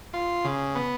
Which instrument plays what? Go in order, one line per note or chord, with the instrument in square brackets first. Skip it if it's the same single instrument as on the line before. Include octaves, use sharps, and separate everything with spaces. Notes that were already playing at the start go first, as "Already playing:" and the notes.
[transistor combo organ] F4
C#3
B3